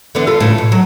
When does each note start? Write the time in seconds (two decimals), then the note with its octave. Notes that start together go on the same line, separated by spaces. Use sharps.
0.15 D3 E3 B3
0.27 F4 A4 B4
0.40 A2 C#3
0.58 B2
0.72 F#3